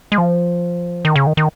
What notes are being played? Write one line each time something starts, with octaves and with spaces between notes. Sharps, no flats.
G#3
F3
D#3
C#3
D#3
D#3